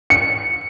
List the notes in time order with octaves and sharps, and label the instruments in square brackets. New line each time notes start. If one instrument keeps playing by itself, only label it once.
[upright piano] C#7